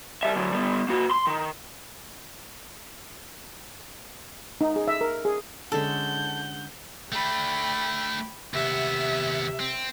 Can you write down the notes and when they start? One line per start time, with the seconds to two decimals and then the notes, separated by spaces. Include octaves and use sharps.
0.23 G3 E5
0.35 D3 F#3
0.52 G3 B3
0.89 A#3 F#4
1.11 C6
1.27 D#3
4.61 D#4
4.76 G#4
4.88 E5
5.01 A#4
5.25 G#4
5.72 D3 G#3 C#4 A4 F#5 G6
7.12 A3 D4 G5 B5
8.54 D#2 C3 B3 E5
9.60 C4